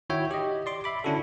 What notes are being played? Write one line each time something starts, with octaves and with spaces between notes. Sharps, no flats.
D#3 E4 F#4 C#5 E5 G5
G4 D#5
D5 C6 D6
E5 B5 D6
D3 C#4 D4 E4 F#4 A4